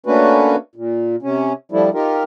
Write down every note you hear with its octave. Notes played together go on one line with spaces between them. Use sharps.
A3 A#3 C#4 D4 F#4 B4
A#2
C3 C#4
F3 G3 A3 D4 E4
D#4 F4 G4 A#4